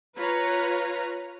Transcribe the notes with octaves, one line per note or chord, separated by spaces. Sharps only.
F4 B4 C#5 A#5